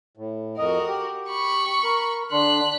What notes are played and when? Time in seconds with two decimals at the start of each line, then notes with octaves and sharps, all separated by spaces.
0.17 A2
0.58 F2 F#4 A#4 D#5
0.88 G4
1.29 B5 C#6
1.84 A#4
2.32 D3 D4 C6 F#6 B6